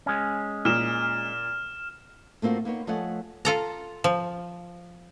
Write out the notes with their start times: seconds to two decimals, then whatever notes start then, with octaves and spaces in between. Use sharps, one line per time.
0.06 G#3 C#4
0.65 A#2 F6 E7
2.42 A3 A#3 C4 F4 F#4
2.65 A#3 B3 D#4 C#5
2.87 F3 A3 C#5 D#5 F#5 G#5
3.45 F4 A4 A#5
4.04 F3